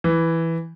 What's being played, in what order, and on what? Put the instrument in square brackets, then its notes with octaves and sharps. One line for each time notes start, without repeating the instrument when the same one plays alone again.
[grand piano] E3